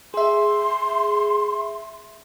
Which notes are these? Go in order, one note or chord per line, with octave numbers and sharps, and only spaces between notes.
G#4 E5 C6